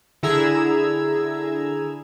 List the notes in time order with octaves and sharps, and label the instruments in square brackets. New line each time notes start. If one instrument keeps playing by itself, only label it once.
[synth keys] D3 E4 G#4 A#5 E6 G#6